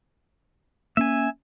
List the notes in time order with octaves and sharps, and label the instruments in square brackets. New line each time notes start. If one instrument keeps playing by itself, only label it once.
[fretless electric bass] A#3 C#4 [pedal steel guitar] E5 G#5